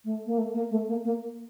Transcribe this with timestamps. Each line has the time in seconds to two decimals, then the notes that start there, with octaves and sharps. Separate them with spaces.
0.05 A3
0.26 A#3
0.38 A3
0.54 A#3
0.71 A3
0.88 A#3
1.04 A#3